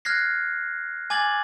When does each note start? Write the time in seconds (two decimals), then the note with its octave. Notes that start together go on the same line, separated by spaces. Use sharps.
0.05 F6 F#6 G#6 A#6 C7
1.10 G#5 D6 G#6 A6 F#7